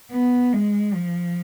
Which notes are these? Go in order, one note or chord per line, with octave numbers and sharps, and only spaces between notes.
B3
G#3
F3